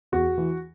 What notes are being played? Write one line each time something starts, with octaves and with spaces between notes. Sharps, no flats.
E2 F#4
E3